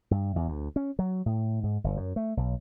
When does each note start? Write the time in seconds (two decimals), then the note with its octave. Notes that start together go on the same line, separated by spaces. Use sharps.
0.11 G2
0.36 E2
0.48 D2
0.76 C#4
0.99 F#3
1.26 A2
1.63 G#2
1.84 G1
1.97 F#2
2.16 A3
2.37 B1